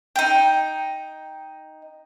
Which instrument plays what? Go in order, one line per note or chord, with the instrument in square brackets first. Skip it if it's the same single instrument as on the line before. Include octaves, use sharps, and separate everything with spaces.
[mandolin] D#4 G5